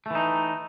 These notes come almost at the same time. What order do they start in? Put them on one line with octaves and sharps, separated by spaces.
A3 E3 D#4